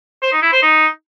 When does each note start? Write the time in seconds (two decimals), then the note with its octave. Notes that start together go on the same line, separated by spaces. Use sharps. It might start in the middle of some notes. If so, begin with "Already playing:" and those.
0.22 C5
0.32 D#4
0.42 E4
0.52 C5
0.62 D#4